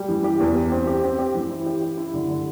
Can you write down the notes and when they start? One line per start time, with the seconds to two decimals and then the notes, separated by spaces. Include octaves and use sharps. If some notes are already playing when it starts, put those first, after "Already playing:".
Already playing: G3
0.09 E3
0.24 G4
0.40 E2
0.56 G4
0.72 C4
0.87 G4
1.03 C4
1.19 G4
1.35 E3
1.51 E4
1.66 G4
1.82 G4
1.98 E4
2.14 D3
2.29 D3